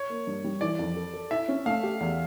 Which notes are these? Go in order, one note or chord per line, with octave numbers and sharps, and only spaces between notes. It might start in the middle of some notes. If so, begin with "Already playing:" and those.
Already playing: C#5
A#3
G2
G3
E3 D5
F2
A4
A4
E4 E5
C#4
A3 F5
G4
E2